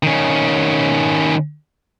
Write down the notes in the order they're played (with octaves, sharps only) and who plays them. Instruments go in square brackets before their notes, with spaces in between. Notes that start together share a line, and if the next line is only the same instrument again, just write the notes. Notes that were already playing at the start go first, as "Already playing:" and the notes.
[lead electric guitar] D#3 C#4